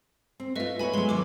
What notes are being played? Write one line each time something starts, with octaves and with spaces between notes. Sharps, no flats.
C4
A3 F4 B4 D#5 E5
B3 A#4 C#5 G#5 B5
F#3 G#3 B5 C6
D#2 A#3 D6